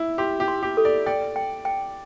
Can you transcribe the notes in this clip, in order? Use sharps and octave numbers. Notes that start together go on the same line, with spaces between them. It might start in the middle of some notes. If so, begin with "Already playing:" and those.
Already playing: E4
G4 C6
G4
C6
G4
A4
D5
D5 G5
G5
G5